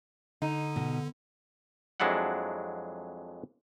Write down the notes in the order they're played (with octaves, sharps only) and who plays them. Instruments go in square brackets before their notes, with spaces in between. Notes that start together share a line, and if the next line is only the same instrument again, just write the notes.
[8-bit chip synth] D3 [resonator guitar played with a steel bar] D#4
[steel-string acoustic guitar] B2
[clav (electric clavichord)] F2 F#3 G#3 D4 E4 F#5